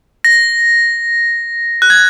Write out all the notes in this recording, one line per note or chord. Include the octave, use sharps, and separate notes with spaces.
A#6
F#6
G#6